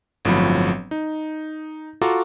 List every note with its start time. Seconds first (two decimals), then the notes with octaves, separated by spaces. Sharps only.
0.25 G1 A2 F3 F#3 C4 B5
0.91 D#4
2.01 F4 F#4 A4 A#5 C#6 D6